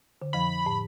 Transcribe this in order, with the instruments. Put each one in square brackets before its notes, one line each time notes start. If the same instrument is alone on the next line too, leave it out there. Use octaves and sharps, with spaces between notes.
[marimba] D3
[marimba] F2 F3 [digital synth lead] B5
[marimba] A2